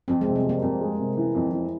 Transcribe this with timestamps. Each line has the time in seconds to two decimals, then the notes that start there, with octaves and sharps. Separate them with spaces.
0.08 F2 C4
0.21 G#3
0.27 C3
0.36 G3
0.44 F2
0.49 A#3
0.62 F2
0.81 G#3
0.99 C3
1.17 E3
1.35 F2
1.52 E3